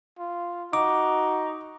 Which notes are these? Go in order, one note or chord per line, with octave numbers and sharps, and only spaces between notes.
F4
D#4 F#4 D6